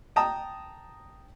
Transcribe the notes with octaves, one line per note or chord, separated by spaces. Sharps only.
G5 A5 A#5 D#6